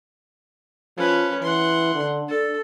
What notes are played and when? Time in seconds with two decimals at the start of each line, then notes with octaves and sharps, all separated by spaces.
0.98 F3 C#4 B4
1.42 E3 F#5 C6
1.95 D3
2.29 D4 A4